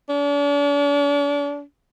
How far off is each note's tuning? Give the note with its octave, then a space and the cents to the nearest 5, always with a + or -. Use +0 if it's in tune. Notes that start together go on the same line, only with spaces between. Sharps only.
D4 -40